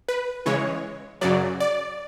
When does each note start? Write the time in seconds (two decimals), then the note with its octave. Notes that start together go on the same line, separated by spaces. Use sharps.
0.08 B4
0.46 C#3 E3 G#3 C#5
1.21 F#2 C#3 F#3 D5
1.60 D5